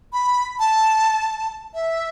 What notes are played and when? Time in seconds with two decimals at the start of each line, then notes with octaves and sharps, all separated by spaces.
0.13 B5
0.59 A5
1.74 E5